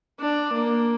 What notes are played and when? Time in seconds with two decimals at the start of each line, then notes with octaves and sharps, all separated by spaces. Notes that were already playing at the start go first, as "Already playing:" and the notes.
0.20 D4
0.54 A#3